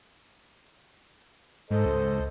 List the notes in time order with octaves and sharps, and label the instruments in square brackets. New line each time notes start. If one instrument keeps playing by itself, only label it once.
[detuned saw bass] G#2 [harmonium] A4 C5 D#5
[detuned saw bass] C#2